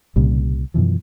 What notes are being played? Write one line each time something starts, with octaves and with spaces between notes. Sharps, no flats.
C2 A#2 C#3 G3
F#2 B2 E3 F3